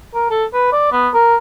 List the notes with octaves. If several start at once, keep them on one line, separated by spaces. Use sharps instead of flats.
A#4
A4
B4
D5
B3
A#4